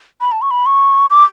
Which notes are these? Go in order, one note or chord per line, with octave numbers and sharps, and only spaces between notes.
B5
A5
C#6
B5
C#6
D6